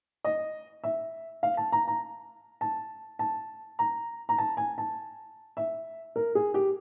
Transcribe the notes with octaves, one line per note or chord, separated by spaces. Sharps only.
D#5
E5
F5
A5
A#5
A#5
A5
A5
A#5
A#5
A5
G#5
A5
E5
A#4
G#4
G4